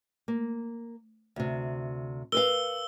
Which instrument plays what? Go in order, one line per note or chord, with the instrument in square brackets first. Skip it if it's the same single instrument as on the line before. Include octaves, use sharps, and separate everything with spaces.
[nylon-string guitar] A#3
D2 C3
[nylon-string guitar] A#4 B4 F5 [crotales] E6 G7